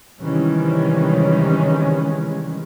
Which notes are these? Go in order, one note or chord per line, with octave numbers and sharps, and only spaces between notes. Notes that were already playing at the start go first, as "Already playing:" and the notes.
C3 D#3 E3 G3 G#3 C#4